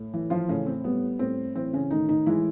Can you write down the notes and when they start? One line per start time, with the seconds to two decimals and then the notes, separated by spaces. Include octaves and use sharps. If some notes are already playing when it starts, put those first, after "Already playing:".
Already playing: A2
0.14 E3
0.30 F3 F4
0.48 A2 C#3 C#4
0.66 C4
0.84 G3 B3
1.19 A2 C4
1.55 E3 C4
1.73 C#3 C#4
1.91 A2 D#3 D#4
2.09 D#3 D#4
2.26 E3 G#3 E4